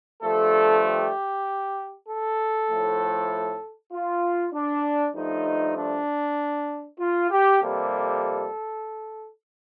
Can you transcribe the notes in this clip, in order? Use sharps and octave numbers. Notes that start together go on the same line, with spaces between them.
G2 F3 A3 A4
G4
A4
A2 F3 A3
F4
D4
G2 F3 A3 D#4
D4
F4
G4
F2 C3 G3 A#3 A4